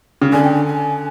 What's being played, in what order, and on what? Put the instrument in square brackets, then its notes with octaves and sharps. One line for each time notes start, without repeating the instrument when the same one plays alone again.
[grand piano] C#3
[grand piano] D3 [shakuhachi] G#5
[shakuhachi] G5
G#5
G#5